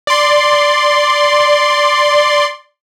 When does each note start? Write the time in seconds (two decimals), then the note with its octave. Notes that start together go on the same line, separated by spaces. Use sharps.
0.07 D5 C6